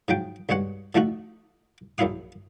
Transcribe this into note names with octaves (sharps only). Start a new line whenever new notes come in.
G#2 F3 F#3 G5
B1 G2 G#3 C#5 F#5
A2 F3 A3 D#4 F#4
A#1 F#2 F#3 E4 F5 D#6